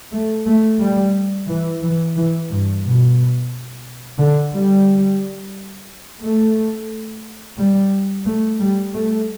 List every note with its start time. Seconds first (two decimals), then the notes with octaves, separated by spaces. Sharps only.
0.13 A3
0.47 A3
0.81 G3
1.48 E3
1.82 E3
2.16 E3
2.50 G2
2.83 B2
4.19 D3
4.53 G3
6.22 A3
7.59 G3
8.26 A3
8.60 G3
8.94 A3